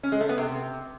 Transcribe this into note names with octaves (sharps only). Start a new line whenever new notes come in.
C#4
G#3
A3
B3
C3